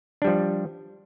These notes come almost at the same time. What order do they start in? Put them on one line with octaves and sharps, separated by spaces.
D4 G3 F3